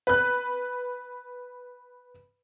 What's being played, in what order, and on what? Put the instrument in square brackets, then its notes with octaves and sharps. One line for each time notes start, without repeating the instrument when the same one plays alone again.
[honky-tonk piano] B4 F#6